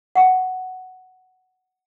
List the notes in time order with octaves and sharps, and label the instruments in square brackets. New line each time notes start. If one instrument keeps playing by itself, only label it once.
[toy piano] F#5 C#6